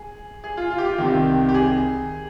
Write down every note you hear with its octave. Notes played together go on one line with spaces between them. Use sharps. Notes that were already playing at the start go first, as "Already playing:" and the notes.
Already playing: G#4
G#4
F4
F4
G4
F4
C2 C3 D#3 G4
G4
G#4